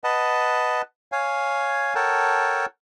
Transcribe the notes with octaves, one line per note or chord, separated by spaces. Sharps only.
B4 D#5 F#5 A5
C#5 F5 G#5
A4 A#4 C#5 F#5 G5 A5